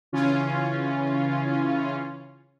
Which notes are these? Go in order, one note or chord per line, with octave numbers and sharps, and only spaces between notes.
C#3 E3 C#4 F4